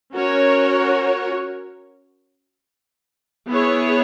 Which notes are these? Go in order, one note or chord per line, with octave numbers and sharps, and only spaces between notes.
C#4 F#4 A#4 C#5
B3 E4 G#4 C#5